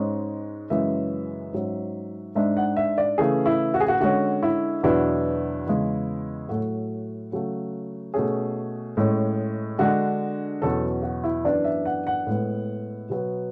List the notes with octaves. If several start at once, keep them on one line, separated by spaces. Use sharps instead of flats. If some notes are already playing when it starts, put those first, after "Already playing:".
Already playing: G#2 G#3 C#4
F#2 C#3 E3 G#3 C#4 E5
G#2 F#3 C#4
G#2 G#3 D4 E5
F#5
E5
D5
C#3 E3 A3 G#4
E4
F#4
G#4
F#4
D3 G#3 C#4 F#4
E4
E2 B2 F#3 B3 D4 E4
E2 C#3 G#3
A2 F#3 A3 F#4
C#3 F#3 A3
B2 A3 C#4 G#4
A2 G#3 C#4
D3 G#3 D4 F#4
E2 B2 F#3 C#4 A4
F#4
E4
F#2 E3 B3 D4 D5
E5
F#5
F#5
A2 G#3 B3
B2 F#3 B3